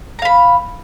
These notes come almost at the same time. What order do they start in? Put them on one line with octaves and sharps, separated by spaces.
A#5 F5 B5